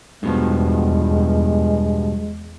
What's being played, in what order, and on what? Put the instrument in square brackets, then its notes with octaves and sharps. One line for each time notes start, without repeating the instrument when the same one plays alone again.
[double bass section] E2 [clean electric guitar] G2 B2 F3 [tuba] G#3